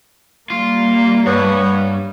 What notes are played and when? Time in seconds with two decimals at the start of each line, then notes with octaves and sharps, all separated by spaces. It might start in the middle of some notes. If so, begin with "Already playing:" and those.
0.50 G3 A#3 F4
1.26 G2 B3 C#5